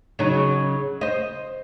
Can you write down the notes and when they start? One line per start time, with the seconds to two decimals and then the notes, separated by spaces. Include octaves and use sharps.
0.19 C#3 F#3 D#4
1.01 C5 D#5